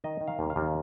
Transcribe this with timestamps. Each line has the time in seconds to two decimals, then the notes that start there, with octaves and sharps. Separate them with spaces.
0.04 D#3 D#5
0.21 D#3
0.28 F5
0.39 D#2
0.50 F5
0.56 D#2